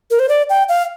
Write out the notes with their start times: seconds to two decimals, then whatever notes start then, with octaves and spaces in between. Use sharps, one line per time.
0.11 A#4
0.19 C5
0.29 D5
0.50 G5
0.69 F5